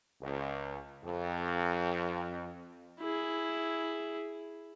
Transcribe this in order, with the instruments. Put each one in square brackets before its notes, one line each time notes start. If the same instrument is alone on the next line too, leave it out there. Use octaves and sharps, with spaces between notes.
[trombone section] C#2
F2
[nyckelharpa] E4 G#4